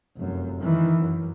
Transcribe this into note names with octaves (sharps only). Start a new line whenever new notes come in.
F1 F#2
D#3 E3
F#2